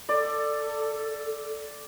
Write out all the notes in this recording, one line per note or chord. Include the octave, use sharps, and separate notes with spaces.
A4 D5